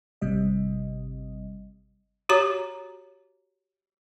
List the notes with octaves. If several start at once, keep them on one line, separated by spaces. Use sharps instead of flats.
G#1 C3 G3 D#5
F#4 G4 C#5 A#5 D6